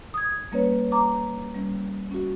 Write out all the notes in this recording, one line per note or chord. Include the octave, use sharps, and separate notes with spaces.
D#6 G#6
G3 A#3 C#4 B4 C#5
A#5 D6
G3 C#4
C#4 F#4